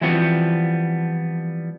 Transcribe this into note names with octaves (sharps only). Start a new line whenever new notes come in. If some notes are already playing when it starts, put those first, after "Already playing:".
E3 F3 G3 B3 C4 F#4